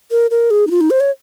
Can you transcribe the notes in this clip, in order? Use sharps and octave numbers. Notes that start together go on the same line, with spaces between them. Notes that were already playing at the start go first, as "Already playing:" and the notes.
A#4
A#4
G#4
D#4
F4
D#4
C5
C#5